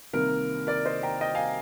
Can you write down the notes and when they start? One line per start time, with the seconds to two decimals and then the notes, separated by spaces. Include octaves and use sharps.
0.13 C2 C3 D#3 A#3 A#4
0.67 A#4 D5
0.85 C5 D#5
1.03 G5 A#5
1.21 D#5 G5
1.35 F5 G#5